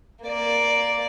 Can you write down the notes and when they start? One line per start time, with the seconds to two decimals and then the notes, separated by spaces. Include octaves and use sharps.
0.24 A#3 D5